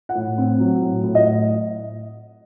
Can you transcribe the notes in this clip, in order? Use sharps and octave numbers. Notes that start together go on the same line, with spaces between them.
F#5
A2
C4
F#3
A2
A2
D#5